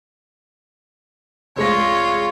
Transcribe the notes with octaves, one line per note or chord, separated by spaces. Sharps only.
F1 G#3 F4 C#5 A#6